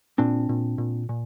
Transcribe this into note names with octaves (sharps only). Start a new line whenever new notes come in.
A#2 C4 D4
A#2
A#2
A#2